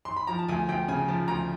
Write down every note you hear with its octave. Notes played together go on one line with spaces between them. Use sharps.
C6
B5
F3 A#5
A5
D2 G#5
D2 G5
C#3 G#5
F3 A5
D2 A#5